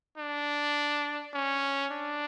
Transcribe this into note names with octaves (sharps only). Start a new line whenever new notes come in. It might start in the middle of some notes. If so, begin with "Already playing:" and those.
D4
C#4
D4